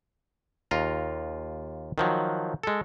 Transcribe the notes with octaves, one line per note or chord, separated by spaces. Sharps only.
D#2 F4 A#5
D#3 F3 F#3
G#3 A4